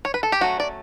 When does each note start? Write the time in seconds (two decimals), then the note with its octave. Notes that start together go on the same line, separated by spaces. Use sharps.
0.05 C#5
0.14 B4
0.23 A4
0.32 G4
0.41 F#3 A3 C#4 F#4
0.60 D5